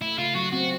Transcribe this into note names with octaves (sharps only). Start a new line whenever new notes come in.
A3 E4
C#3 F4
F#3 F#4
C4 F#4